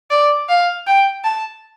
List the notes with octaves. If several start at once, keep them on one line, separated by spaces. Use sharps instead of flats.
D5
F5
G5
A5